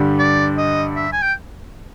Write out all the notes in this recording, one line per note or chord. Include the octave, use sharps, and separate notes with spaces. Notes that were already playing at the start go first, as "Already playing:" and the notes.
Already playing: G2 D3 G3
D5
D#5
E5
G#5
G5